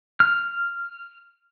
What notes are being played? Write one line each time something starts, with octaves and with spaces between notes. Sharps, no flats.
F6